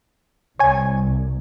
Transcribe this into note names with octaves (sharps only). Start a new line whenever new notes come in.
C2 C#5 G#5